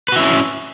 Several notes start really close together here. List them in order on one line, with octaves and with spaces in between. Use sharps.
B4 F#4 E4 C#4